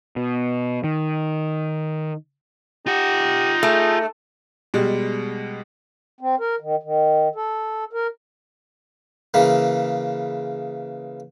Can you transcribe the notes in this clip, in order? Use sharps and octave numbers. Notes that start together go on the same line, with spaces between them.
B2
D#3
D#4 F4 G4 F#5
A3 G#4
B2 G3 G#3
C4
A#4
D#3
D#3
A4
A#4
C#3 E3 A#3